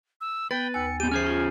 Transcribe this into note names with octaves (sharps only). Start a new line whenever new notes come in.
E6
B3 B4 G5 A6
D#2 G#5 E6 C#7
B3 G4 G6 D#7
C#4 G#4 C5 G#5 F6 G6 C7
F4 G#5